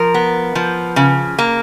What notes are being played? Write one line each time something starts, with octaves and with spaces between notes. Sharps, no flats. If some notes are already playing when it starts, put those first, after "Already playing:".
Already playing: F3 A#4
B3
F3
C#3
A#3